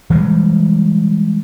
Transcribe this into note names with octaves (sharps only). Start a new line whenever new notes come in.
E3 G3 G#3